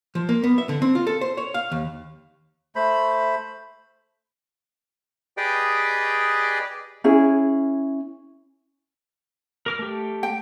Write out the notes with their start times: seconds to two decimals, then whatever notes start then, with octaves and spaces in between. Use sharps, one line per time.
0.15 F3
0.29 A#3
0.43 B3
0.58 E5
0.69 D3
0.82 C4
0.95 F4
1.07 A4
1.21 C5
1.37 C#5
1.54 F5
1.72 D#2
2.76 A3 C5 B5
5.37 G4 G#4 B4 D5 D#5 G5
7.04 C#4 E4 G#4
9.66 A#4 D6 F6
9.79 A3 G4
10.23 G5